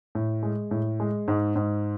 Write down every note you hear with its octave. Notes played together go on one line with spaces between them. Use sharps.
A2
G#3
A2
G#3
G#2
G#2